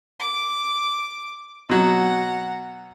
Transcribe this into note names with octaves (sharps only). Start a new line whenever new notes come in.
D6
B2 F#3 F#5 A#5